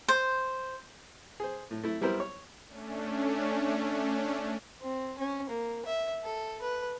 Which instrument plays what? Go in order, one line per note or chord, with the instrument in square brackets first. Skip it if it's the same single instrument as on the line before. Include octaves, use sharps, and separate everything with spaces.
[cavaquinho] C5
[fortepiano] G#4 C5
A2
A3 E4
G3 B3 E4 A#4 C5
C#5
[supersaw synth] A3 C#4 D4
[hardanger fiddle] C4
C#4
A#3
E5
A4
B4